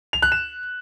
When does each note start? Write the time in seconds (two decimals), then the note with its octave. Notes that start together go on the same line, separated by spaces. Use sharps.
0.13 F7
0.22 F#6
0.32 E7